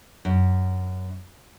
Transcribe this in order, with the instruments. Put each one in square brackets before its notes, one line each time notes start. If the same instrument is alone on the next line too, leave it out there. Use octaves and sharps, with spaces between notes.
[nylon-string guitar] F#2